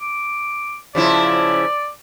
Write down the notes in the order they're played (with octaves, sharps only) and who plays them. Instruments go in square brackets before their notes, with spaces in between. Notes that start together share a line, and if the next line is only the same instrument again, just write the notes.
[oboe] D6
[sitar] C#3 F3 E4 [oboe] D5